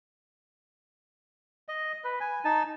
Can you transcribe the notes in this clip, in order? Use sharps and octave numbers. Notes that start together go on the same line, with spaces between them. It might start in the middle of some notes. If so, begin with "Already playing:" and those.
D#5
B4
G#5
D#4 A5